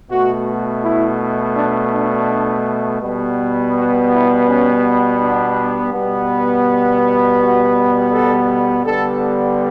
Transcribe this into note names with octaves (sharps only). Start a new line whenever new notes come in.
B2 A3 F#4
E4
D4
D4
B2 G3 B3
F#4
E4
C#4
D4
B2 G3 B3
F#4
A4
D3 G3 B3 A4